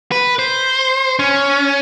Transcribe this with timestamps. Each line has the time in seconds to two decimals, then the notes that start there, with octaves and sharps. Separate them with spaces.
0.12 B4
0.39 C5
1.19 C#4